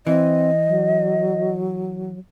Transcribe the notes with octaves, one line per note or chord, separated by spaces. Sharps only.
E3 C4 D#5
F#3